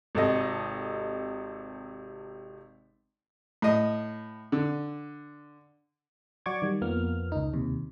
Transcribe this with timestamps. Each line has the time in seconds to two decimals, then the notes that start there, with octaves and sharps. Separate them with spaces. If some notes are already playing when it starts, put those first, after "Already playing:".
0.15 G#1 C3 A4 D#5
3.62 A2 D#5
4.52 D3
6.46 F#3 F#4 D5 C#6 D6 G#6
6.62 D#3 G3
6.81 F2 F3 A#3 B3 F6
7.32 C#2 D#4
7.53 D#2 C3